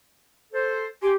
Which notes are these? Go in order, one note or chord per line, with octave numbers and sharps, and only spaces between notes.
A4 C5
G4 G#5 C6 D6